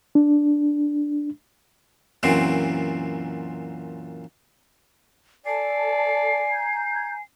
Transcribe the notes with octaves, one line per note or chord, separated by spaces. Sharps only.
D4
F#2 A#2 E3 C4
A4 D5 G#5 A5 C7
A#5 G6 G#6